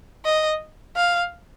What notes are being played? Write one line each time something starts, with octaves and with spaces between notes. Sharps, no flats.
D#5
F5